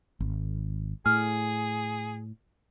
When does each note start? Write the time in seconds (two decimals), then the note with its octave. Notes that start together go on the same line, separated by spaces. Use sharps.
0.20 G#1
1.06 A2 G#4 F6